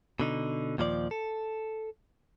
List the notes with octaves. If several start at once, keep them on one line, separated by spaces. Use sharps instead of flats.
B2 D3 D#4
D#2 A#2 F3 A4 D5
A4